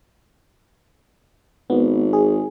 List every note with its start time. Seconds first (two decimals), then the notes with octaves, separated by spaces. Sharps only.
1.70 G#1 B3
2.13 G#4